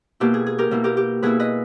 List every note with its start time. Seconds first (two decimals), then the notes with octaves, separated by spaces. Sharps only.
0.20 B2 A#3 E4 G4
0.34 G#4
0.46 G#4
0.58 G4 A#4
0.71 B2 A#3 E4
0.84 G4 A#4
0.97 G4
1.22 B2 A#3 E4 G#4 B4
1.39 B4 D#5